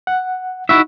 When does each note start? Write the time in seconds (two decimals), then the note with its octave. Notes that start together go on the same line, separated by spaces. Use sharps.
0.07 F#5
0.69 D#4 E4 F#4 E5